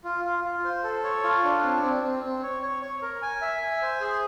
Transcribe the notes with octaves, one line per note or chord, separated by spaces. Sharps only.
F4
F4
F4
C5
A4
C#5
F4
D4
C4
C4
C4
C4
C#5
C#5
C#5
A#4
G#5
E5
G#5
C5
G#4